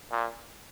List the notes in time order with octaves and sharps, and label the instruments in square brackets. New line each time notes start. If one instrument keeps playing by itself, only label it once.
[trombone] A#2